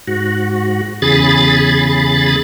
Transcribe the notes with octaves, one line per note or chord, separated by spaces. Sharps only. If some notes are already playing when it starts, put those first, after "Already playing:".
G#2 F#4
E2 C#3 G#4 B5 A6